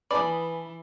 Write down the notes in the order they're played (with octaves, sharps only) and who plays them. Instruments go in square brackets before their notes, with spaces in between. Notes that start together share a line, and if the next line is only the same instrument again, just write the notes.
[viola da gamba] E3 [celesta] B4 G#5 A5 [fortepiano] D5 [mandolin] B5 D#6